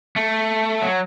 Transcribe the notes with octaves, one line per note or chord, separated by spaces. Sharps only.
A3
F#3